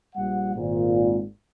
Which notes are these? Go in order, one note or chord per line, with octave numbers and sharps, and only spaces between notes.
A#1 G3 F#5
G#1 A#2